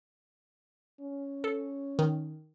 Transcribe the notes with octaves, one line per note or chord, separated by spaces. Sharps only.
C#4
A4
D#3